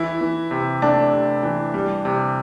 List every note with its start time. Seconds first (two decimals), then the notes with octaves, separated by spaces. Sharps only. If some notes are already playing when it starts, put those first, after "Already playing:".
Already playing: E3 E4
0.21 E3
0.51 C3
0.82 A3 D4
1.12 C3
1.43 E3
1.74 G3
2.05 C3